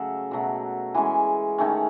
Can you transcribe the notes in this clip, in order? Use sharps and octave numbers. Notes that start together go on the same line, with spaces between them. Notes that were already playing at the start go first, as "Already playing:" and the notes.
Already playing: C#3 F#3 A3 E5 F#5
B2 F#3 A3
E3 G#3 C#4 G#5
D#3 A3 C#4